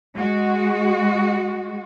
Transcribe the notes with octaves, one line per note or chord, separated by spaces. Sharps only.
G#3 F#4